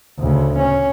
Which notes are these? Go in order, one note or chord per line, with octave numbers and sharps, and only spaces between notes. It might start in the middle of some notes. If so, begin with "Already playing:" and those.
D2 C#3
C#4